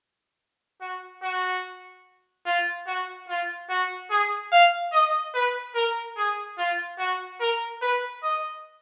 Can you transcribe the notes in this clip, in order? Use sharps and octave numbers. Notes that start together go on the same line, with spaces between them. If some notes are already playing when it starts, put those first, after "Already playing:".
F#4
F#4
F4
F#4
F4
F#4
G#4
F5
D#5
B4
A#4
G#4
F4
F#4
A#4
B4
D#5